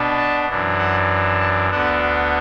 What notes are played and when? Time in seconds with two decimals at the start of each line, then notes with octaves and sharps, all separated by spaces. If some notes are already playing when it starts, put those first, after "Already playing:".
Already playing: B2 B3 D4
0.17 A5
0.48 F#2 E3 D4
0.78 F#5
1.39 A5
1.70 D2 D3 B3 D4 F#5